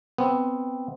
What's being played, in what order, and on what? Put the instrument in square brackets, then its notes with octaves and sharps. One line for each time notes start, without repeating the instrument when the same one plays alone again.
[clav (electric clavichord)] B3 C4